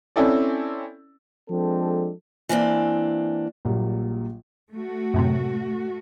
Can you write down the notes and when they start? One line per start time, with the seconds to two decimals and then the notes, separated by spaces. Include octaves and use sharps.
0.16 C4 C#4 E4 A4 D5
1.49 F3 G#3 C4 D4 A4
2.49 E3 A#3 C4 D4
3.65 A#1 A#2 F#3 G3
4.73 A3 F#4
5.14 F#2 A2 C3